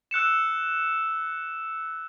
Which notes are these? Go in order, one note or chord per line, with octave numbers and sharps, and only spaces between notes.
E6 F#6 C#7 E7